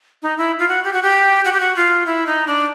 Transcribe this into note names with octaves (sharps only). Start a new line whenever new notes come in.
D#4
E4
F4
F#4
G4
F#4
G4
F#4
G4
F#4
F4
E4
D#4
D4